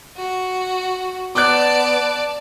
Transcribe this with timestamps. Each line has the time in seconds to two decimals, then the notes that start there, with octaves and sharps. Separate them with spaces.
0.17 F#4
1.35 B3 D5 A5 D6 F#6